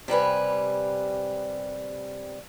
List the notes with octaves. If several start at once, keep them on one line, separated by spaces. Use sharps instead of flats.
C3 G3 B4 G#5